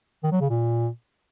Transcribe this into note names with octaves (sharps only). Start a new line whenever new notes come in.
D#3
F#3
C#3
A#2